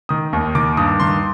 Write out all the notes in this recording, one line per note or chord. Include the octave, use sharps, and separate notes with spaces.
D#3 D#6
D#2
D#3 D6
G2 D#6
D#3 C6